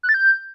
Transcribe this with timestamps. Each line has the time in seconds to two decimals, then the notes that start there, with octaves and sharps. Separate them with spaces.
0.03 F#6
0.09 A6
0.14 G6